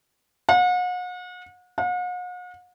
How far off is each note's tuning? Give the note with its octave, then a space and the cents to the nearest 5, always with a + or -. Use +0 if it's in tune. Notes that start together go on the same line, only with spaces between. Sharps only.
F#5 -40
F#5 -45